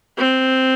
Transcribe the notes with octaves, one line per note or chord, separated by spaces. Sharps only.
C4